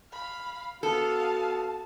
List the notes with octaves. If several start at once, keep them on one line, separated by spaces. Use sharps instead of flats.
F5 B5
B3 F#4 A4 F5 A5